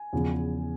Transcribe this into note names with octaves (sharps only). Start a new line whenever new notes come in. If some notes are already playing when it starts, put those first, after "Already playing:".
Already playing: G#5
E2 C#3 F3